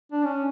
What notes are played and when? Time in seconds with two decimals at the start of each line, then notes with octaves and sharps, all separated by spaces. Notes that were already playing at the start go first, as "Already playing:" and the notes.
0.12 D4
0.24 C#4